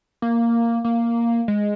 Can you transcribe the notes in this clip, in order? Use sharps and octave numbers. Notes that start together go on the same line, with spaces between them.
A#3
A#3
G#3